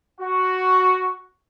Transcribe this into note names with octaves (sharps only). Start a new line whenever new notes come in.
F#4